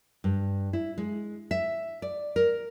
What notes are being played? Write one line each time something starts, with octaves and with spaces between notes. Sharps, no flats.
G2
E4
G#3
E5
D5
A#4